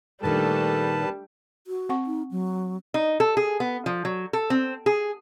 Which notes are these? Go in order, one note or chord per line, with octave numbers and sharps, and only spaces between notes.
A#2 D#3 G3 A3 D4 A4 B4 A5
F#4
C4 F#5 C#6
D#4
F#3
D#4
A4
G#4
B3
F3
F#3
A4
C4
G#4